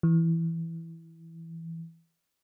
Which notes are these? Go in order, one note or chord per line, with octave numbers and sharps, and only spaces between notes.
E3